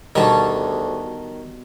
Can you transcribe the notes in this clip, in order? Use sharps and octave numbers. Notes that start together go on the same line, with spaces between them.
D2 B2 D#3 G3 C#5 A5